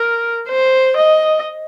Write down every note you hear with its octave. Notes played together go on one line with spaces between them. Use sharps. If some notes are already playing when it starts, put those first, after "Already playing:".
Already playing: A#4
C5
D#5